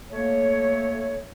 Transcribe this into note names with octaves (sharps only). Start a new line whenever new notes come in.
A3 A#3 C#5